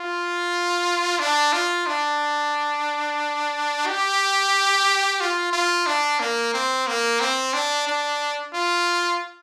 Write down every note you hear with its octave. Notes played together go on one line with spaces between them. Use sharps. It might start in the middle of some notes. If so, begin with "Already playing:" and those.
Already playing: F4
D4
F4
D4
G4
F4
F4
D4
A#3
C4
A#3
C4
D4
D4
F4